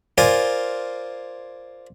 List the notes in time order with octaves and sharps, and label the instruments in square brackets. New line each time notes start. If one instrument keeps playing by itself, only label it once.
[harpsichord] F4 A#4 C5 D5 G#5